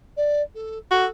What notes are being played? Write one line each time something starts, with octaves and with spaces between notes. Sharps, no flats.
D5
A4
F#4 A4